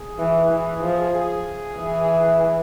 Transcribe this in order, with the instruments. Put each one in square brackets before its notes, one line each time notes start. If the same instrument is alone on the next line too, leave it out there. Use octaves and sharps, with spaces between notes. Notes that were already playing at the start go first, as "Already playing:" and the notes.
Already playing: [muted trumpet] G#4
[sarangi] E3
E3
F3
[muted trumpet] G#4
[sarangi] E3